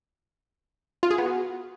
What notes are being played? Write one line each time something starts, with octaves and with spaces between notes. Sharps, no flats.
F4
G#4
B3
F#4